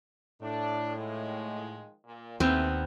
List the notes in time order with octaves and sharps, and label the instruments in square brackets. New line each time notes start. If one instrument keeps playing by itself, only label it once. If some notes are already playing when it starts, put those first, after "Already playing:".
[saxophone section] A2 [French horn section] D4
[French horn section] D#3 F3 G#3
A#2
[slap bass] D#2 [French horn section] D3 B3 [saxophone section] E3 A3 [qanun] C4